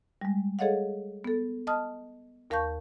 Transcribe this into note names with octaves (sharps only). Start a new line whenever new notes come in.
G3 G#3
G#4 A4 C#5 D#5 F5 F#5
B3 A4
D#5 A5 D#6 F6
D#2 A#4 F5 A5 C#6 G6